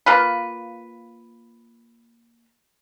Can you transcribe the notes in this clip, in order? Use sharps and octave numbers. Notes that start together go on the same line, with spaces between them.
A#3 F4 B4